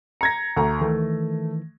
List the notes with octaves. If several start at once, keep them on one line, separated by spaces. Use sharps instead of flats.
A#5 G#6 A#6 C#7
D2 A#5
D#3 E3 A3